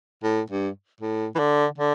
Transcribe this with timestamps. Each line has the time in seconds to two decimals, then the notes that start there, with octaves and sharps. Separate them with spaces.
0.23 A2
0.50 G2
1.01 A2
1.35 E3
1.39 D3
1.78 D3